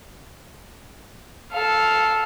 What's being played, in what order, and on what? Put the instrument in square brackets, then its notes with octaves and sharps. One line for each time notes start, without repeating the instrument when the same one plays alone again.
[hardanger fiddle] A4 F5